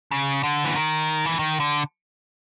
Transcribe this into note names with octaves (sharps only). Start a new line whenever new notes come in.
C#3
D3
E3
D#3
E3
D#3
D3